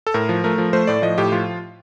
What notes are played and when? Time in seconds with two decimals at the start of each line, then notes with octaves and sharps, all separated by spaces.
0.07 A4
0.14 A2 A#4
0.29 F3
0.44 A3 A#4
0.58 F3
0.73 A3 C5
0.87 A2 D5
1.02 F3 D#5
1.18 A2 G4
1.32 F3 F4